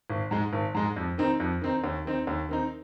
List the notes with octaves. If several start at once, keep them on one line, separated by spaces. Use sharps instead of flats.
G#1
G#2 G#3
G#1
G#2 G#3
F2
D#3 C4 D#4
F2
D#3 C4 D#4
D#2
D#3 C4 D#4
D#2
D#3 C4 D#4